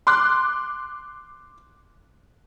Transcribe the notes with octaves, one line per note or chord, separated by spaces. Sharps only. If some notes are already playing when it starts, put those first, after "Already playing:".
C6 D6 F#6